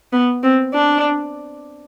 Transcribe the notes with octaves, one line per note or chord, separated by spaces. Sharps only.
B3
C4
D4